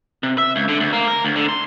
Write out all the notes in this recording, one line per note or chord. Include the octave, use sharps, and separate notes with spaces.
C3
E5
C#2
D3
D2
A#3
A#4
D2
D3
C6